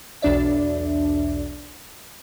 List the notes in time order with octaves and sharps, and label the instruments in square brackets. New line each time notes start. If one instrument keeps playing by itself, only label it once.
[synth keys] B1 E2 D4 D5 E5